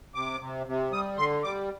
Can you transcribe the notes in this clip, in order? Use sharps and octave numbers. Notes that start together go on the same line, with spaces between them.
C3 D6
C3
C3
G3 D#6
D3 C6
G3 D6